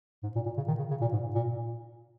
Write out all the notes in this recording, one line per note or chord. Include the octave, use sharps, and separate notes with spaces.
G#2
A#2
A#2
C#3
D#3
C#3
C#3
A#2
G#2
A#2